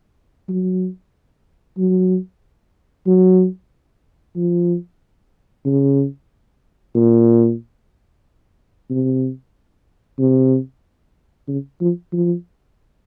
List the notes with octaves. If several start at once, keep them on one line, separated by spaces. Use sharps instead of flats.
F#3
F#3
F#3
F3
C#3
A#2
C3
C3
C#3
F3
F3